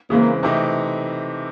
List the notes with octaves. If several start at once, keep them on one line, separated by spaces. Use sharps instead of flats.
C#3 E3 G#3 A#3 C4
C3 E3 A3 C4 D#4